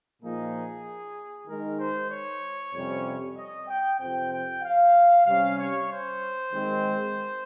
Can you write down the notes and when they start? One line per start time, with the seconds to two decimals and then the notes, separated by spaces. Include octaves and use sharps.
0.21 A#2 F3 A#3 D#4 G#4
1.47 D#3 G#3 D#4 A#4
1.79 C5
2.10 C#5
2.73 F2 C3 G3 C#4
3.36 D#5
3.68 G5
3.99 F2 C3 F3 C4 G5
4.31 G5
4.63 F5
5.26 C3 G3 C#4 F5
5.58 C#5
5.90 C5
6.53 D#3 G#3 C4